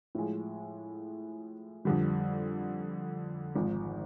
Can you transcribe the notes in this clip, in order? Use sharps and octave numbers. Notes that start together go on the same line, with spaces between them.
A2 F3 G#3
F2 D3 G3
G#1 G#2 F3